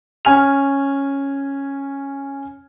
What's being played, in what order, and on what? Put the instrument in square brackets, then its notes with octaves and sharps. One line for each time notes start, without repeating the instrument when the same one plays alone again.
[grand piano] C#4 G#5 F6 F7